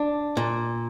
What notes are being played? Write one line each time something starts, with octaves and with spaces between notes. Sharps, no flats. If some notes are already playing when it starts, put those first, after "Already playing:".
Already playing: D4
A#2